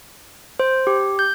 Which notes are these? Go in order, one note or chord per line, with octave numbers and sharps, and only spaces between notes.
C5
G4
G6